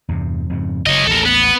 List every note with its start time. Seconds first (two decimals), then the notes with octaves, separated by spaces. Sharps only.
0.09 E2 G2 C3
0.50 F2 G#2 C#3
0.86 F#1 C#5 D#5
1.07 A1 D#2 A4 A#4
1.25 B3